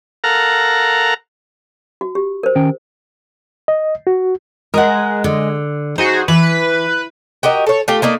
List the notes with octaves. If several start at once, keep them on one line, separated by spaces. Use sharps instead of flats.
A4 A#4 F5 F#5 A#5
F#4
G4
A#4 C5
D#3 C#4 G5
D#5
F#4
G#3 A#4 D#5 F#5
D3
D#4 F#4 G#4 C5
E3 B4
F#4 G4 A#4 D#5
A4 C#5
A3 F4 G4
A3 A#3 D#4 D5